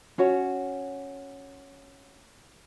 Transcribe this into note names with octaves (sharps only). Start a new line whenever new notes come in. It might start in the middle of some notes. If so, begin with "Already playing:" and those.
C#4 F#4 C#5